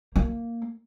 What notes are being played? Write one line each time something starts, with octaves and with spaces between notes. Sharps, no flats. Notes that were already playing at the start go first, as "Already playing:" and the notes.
A#3